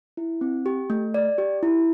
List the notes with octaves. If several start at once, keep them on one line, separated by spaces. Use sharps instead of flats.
E4
C4
G4
A3
D5
G4
E4